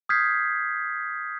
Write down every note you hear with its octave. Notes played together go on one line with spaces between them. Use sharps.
D#6 F6 G6 G#6 B6 C7